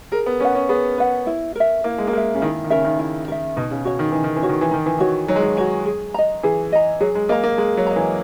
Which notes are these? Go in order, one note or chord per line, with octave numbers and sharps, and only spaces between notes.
G#4 A#4
B3
C#4 B4 F#5
C#4
B3 G#4
B4 F#5
E4
A#4 E5
A#3 E4
G#3
A#3
G#3 A#4 E5
C#3
D#3 E4
D#3
C#3 A#4 E5
D#3
E4
A#4 E5
B2 D#4
C#3
F#4 C#5
D#3
E3 D#4
D#3
E3
F#4 C#5
D#3
E3
D#3 D#4
E3
D#3 F#4 C#5
F#3 D#4
G#3
F#3
F#4 C#5
G#4
D#5 A#5
E3 G#4
D#5 A#5
F#3 G#4
G#3
A#3 D#5 A#5
A#3
G#3 G#4
F#3
D#5 A#5
E3